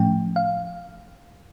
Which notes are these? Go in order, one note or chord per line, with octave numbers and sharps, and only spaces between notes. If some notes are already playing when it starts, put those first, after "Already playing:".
Already playing: A2 F3 A3 C#4 G5
F5